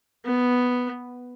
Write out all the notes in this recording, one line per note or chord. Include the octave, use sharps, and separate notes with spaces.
B3